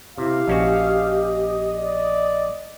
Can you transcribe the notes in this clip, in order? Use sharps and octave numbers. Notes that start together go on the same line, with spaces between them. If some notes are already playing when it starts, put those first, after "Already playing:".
C3 E4 G4 F5
A#1 C#4 F#4 D#5
D5